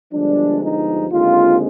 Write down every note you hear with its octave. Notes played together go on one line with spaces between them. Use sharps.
G1 G2 F3 G#3 D4
D#4
D#2 D3 G#3 C4 F4